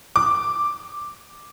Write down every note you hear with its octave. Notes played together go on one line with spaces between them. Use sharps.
D6